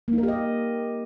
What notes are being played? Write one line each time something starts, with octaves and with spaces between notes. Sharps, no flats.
A#3
D#4
A#4
G4
D#5